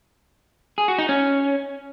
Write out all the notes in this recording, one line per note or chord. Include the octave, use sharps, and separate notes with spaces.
G#4
F#4
D#4
C#4